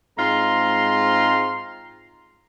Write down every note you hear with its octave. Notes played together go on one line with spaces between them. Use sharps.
G#2 G#3 C4 F4 A#5 C6